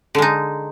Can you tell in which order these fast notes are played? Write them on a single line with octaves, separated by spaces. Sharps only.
D3 G#3 D#4